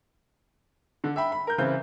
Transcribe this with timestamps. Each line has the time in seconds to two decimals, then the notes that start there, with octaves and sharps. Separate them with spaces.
1.04 D3
1.16 E5 G5 B5
1.32 B5
1.47 A#4 G6
1.58 C#3 E3 C4 B4 G6